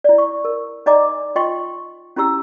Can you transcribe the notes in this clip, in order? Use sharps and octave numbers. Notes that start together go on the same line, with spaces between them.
E4 D5
C#6
A#4
D#4 D5 D#5 G#5 A#5 D6
F4 D#5 G5 C6 C#6
C#4 E4 G4 A#5 E6